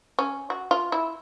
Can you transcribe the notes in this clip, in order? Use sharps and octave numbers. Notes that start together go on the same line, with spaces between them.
C#4
F#4
F4
E4